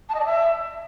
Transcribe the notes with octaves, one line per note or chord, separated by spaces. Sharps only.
A5
D#5
D5
E5